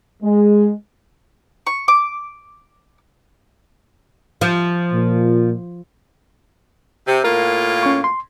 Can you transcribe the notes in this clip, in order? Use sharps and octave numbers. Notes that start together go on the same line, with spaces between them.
G#3
C#6
D6
F3
A#2
C3
A2 A#3 F4 A#4
C#4 C#6
C6